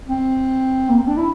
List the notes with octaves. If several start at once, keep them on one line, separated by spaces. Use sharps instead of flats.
C4
A#3
C4
D4
E4